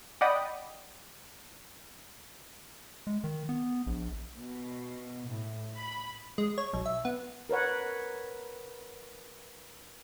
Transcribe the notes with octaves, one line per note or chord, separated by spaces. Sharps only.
D5 D#5 F#5 G5 B5 D#6
G#3
D#3
B3
A#1
B2
A2
B5
G#3
C#5
B1
E5
B3
A#4 B4 C#5 F#5